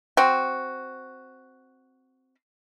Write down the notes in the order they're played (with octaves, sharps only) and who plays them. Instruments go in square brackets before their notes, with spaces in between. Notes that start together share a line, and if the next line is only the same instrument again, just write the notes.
[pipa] C4 F#4